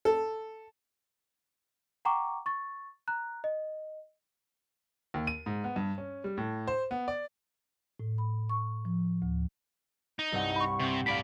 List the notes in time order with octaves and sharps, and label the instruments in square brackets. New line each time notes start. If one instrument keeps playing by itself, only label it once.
[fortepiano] A4
[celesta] F#5 G5 A#5 C#6 D6
C#6 A6
A#5 F#6
D#5
[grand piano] D#2
D#7
G#2
B3
G2
C#4
G3
A2
C5
B3
D5
[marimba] A2
B5
C#6
F3
D2
[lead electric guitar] D#4
[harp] C2 G2 F#5
[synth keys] B5 C#6
[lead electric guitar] C3 [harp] C4
[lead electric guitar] A2 D5 [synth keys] F5 B5 B6